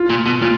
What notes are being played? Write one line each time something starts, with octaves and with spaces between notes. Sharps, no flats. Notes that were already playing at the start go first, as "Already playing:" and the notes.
Already playing: F4
A#2
B2
A#2 F4